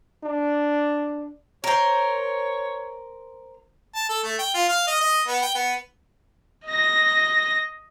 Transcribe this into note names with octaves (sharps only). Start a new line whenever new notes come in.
D4
A#4 C5 C#5
A5
A4
A3
G5
F4
F5
D#5
D#5
B3
G5
B3
D#5 A#6